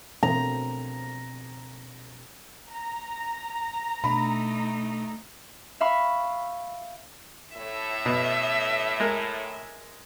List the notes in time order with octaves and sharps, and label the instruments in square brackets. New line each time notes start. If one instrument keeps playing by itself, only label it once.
[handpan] B2 C4 C5 [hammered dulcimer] A#5
[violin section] A#5
[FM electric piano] B2 D4 [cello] A3 D#4 [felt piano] B5
[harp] E5 F5 B5 C#6
[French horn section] A2 [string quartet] E5
[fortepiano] B2
G#3 A#4